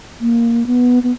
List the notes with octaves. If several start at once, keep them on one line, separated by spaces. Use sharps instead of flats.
A#3
B3
B3